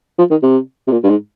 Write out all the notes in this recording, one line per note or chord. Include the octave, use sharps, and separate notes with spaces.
F3
D#3
C3
C3
A#2
G2
G#2